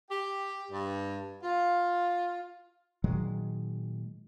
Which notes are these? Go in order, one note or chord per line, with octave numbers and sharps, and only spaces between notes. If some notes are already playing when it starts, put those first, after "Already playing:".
G4
G2
F4
A#2 D#3 F#3 G#3